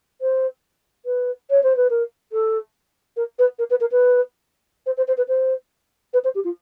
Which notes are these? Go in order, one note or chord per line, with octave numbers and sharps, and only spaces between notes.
C5
B4
C#5
C5
B4
A#4
A4
A#4
B4
A#4
B4
A#4
B4
C5
C5
C5
B4
C5
B4
C5
G4
F4